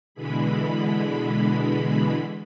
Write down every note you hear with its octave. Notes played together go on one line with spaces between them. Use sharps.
B2 D3 E3 G#3 B5